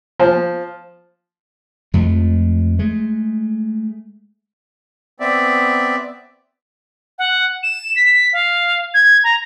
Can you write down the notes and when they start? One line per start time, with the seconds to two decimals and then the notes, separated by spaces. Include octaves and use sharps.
0.20 F3
1.94 F2 F3 G#3 A3
2.79 G#3 A3
5.20 B3 C4 D5 E5
7.19 F#5
7.63 E7
7.96 B6
8.33 F5
8.94 G#6
9.24 A#5